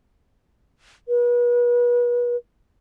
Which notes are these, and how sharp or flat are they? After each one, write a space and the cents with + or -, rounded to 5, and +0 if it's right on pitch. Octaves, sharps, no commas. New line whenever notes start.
B4 -35